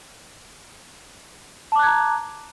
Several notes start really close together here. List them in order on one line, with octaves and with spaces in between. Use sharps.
A5 D6 F#6 G#6 A#5